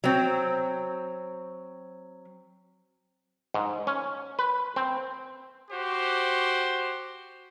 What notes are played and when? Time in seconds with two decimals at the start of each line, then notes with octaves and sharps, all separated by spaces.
0.04 F#3 C4
3.54 G#2
3.87 C#4
4.39 B4
4.76 C4
5.71 F#4 G4 C5